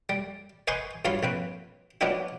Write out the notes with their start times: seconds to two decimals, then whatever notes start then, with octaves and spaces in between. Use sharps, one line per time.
0.09 G3
0.68 B4 C5 D#5 G#5 C6 C#6
1.05 G2 F#3 F4 C#5 F5 B5
1.23 A#1 C4 B4
2.01 F#3 B3 D4 D#4 F4 G4